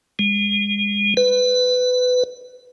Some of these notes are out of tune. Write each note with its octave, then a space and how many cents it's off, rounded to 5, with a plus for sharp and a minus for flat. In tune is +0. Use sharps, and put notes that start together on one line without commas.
G#3 -35
B4 +20